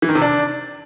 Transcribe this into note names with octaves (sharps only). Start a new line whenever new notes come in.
E3
D#3
C3
D4